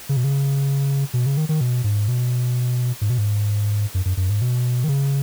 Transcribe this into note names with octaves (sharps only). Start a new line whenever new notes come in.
C#3
B2
C#3
B2
C#3
D#3
D#3
B2
G#2
B2
G#2
B2
G#2
F#2
F#2
F#2
G#2
B2
D#3
C#3